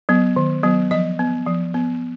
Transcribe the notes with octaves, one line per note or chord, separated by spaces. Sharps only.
F#3 B3
D#3
F#3 B3
F3 D#5
B3
F3
B3